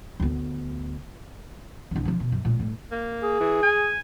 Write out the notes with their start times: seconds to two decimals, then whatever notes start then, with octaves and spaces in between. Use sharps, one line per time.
0.20 D2 B3
1.91 G1 C2
2.05 C3 F3
2.20 B2
2.32 F#2
2.45 A#2 G#3
2.59 A2 G3
2.91 A#3
3.22 G#4
3.41 E3
3.63 G#5